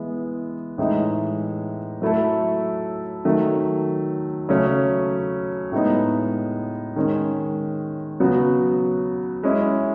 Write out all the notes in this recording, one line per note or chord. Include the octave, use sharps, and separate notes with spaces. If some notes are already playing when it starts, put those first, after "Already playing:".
Already playing: E3 G#3 B3
A2 E3 G#3 D#4
F#3 A3 E4 A4
D#3 F#3 A3
C#3 F#3 A3 C#4
A2 G#3 B3 D#4
D#3 G#3 C#4
C#3 F#3 B3 F#4
G#3 C#4 E4